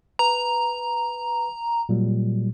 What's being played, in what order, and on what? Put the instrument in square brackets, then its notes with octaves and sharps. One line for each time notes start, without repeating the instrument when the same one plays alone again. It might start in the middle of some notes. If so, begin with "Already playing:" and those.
[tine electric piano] B4 [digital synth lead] A#5
[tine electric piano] A#2 F#3 G3